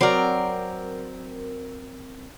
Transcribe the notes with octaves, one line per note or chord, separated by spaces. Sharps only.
F#3 C4 A#4 D5